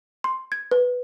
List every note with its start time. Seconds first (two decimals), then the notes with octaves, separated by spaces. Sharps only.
0.24 C6
0.52 G#6
0.71 B4